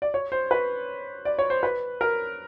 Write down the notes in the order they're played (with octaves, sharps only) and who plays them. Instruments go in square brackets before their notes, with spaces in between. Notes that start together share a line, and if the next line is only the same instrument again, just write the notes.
[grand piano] D5
C#5
C5
B4
D5
C#5
C5
B4
A#4